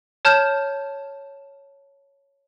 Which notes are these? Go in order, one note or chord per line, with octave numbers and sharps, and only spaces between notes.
C#5 A5 F6 G6 E7